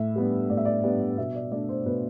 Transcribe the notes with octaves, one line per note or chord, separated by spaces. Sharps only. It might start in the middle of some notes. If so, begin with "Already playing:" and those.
Already playing: A2 E5
G3 B3 D4
A2 D5
E5
D5
G3 B3 D4
B2 E5
D5
A3 D4 D5
C5
B2 B4